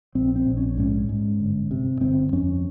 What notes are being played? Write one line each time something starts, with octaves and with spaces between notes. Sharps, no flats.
A#1 C4
C4
A#1
C#4
G#2 C#4
G#2
G1
C3
G1 C4
F2 C#4